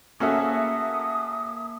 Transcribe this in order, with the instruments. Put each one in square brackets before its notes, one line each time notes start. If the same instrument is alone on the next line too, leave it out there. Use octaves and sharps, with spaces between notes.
[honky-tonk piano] A#3 A4 E5 [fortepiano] C#4 F#4 G#4 [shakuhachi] D#6